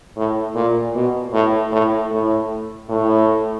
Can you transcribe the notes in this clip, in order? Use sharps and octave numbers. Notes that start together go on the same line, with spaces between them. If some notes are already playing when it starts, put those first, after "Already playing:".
A2
A#2
B2
A2
A2
A2
A2